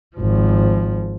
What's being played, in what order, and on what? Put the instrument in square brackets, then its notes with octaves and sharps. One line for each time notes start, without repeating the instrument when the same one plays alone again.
[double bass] G#1 F3